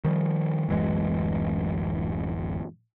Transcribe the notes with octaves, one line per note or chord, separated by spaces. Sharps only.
D#3 F3 G3
D1 F#2 E3 G#3